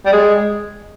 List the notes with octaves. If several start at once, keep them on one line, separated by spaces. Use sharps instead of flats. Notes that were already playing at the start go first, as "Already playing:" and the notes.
G3
G#3